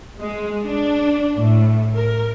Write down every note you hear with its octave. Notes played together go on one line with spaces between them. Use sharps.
G#3
D4
A2
A#4